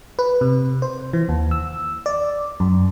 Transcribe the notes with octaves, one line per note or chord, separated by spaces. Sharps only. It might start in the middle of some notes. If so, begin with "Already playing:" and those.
B4
C3
C5
E3
D#2
E6
D5
F#2